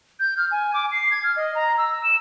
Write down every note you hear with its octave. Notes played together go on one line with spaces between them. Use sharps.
G6
F6
G#5
D6
C7
G#6
F6
D#5
A#5
E6
E7